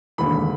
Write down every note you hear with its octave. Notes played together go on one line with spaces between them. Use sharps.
E1 D#2 D3 B5